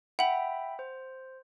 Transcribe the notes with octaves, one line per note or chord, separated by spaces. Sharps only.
E5 F#5 G5 B5 F#7
C5